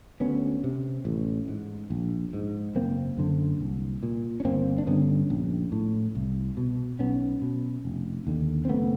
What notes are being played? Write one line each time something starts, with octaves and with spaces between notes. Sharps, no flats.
D2 B3 C#4
C3
A1
G#2
A#1
G#2
F#1 A#3 C4
F#2 D3
C2
A#2
C#4
G1 A#3 C4
D4
G2 D3 B3 C#4
A#1
A2
C2
B2
B1 B3 C#4
B2
F1
D#2 D3
C4
F#1 A3 B3